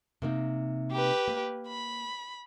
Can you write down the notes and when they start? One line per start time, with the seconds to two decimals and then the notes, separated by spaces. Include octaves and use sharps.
0.22 C3 A#3 D#4
0.92 G4 B4
1.28 A#3
1.68 B5